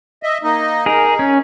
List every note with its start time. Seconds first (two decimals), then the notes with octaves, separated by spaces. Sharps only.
0.23 D#5 E5
0.43 A#3 D#4 D#5
0.86 D#4 G#4 A#4
1.19 C#4